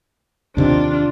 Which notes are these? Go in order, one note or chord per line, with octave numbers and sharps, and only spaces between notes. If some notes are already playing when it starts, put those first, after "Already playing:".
D#2 C3 D#3 D4 F4